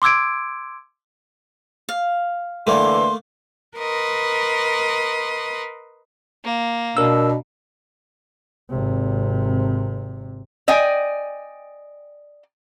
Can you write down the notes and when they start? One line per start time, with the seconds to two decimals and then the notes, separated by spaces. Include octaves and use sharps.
0.02 C6 D6 E6 G#6 D7
1.89 F5
2.67 D3 E3 A3 A#3 C6
3.77 A#4 B4 D#5 C6
6.44 A#3
6.97 B2 D4 A#4 E6
8.70 G#1 C3
10.68 D5 D#5 G5 G#5